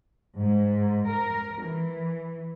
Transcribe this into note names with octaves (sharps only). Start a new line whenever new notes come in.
G#2
A#4
E3